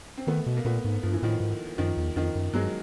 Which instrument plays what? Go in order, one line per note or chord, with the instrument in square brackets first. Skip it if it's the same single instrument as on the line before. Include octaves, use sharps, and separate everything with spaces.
[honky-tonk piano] C4
[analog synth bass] D#3 [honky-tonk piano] A3 B3
[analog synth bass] B2
[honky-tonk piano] A#3
[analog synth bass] A#2 [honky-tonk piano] A3 B3
[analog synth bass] G#2
[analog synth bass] G2 [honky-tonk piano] F3
[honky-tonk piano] E3
[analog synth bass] A2 [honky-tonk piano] D#3 F3
[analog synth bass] G#2
[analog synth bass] F#2 [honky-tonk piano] D#3 F3
[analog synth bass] E2
[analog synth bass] F2 [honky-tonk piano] D#3 F3
[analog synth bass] F#2
[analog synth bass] G2 [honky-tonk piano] F#3 G#3